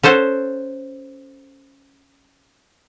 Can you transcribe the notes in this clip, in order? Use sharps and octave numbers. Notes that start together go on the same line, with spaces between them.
C#4 A4 C5 F#5